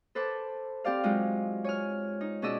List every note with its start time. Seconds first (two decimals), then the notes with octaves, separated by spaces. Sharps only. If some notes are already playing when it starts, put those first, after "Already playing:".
0.15 A4 B4 C5 A5 D6
0.85 C4 G4 D5 F5
1.04 F#3 G#3 D#4 F4
1.64 C#5 G#5 F6
2.21 D#4
2.42 B2 C#4 G#4 D5 D#5 E6